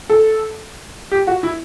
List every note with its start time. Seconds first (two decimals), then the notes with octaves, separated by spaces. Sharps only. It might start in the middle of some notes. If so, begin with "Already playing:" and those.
0.10 A4
1.12 G4
1.27 F#4
1.43 E4